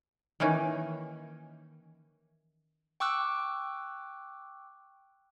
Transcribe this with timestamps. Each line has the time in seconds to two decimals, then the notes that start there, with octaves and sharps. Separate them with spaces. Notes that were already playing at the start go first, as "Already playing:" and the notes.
0.40 D#3 E3 A#3 C#4 D#4
3.00 G5 C#6 D6 E6 F#6